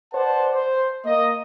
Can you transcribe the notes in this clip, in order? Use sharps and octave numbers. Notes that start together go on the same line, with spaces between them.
B4 C5 D5 F#5 A5
C5
A#3 D#5